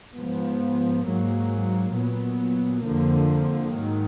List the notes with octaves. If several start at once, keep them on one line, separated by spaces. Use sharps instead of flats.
G#2 F3 B3
G#2 F#3 A#3
A#2 F#3 B3
F2 D3 F3 A#3
G#2 D#3 F#3